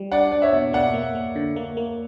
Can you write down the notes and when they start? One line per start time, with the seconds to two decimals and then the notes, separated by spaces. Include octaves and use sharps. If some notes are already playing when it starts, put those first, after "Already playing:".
Already playing: G3
0.12 D4 D5 F#5
0.32 D4 D5
0.42 C#5 E5
0.53 B2
0.73 A#3 D5 F#5
0.94 A#3
1.15 A#3
1.36 D3
1.56 A#3
1.77 A#3